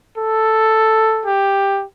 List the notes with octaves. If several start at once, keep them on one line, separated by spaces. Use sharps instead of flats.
A4
G4